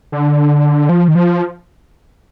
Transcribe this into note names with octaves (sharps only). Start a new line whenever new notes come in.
D3
F3
D#3
F3